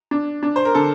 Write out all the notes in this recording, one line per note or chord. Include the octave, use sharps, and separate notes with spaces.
D4
D4
C5
A#4
D3 A4